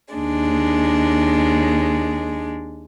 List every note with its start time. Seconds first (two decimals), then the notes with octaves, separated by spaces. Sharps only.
0.14 D#2 G#3 D4